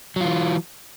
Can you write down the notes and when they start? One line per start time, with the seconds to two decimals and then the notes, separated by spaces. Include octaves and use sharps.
0.16 F#3
0.21 F4
0.25 E3